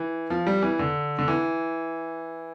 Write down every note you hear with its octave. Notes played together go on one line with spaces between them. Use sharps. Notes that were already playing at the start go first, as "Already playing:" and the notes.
Already playing: E3
F3
G3
E3
D3
D3
E3